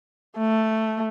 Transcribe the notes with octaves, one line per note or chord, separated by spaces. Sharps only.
A3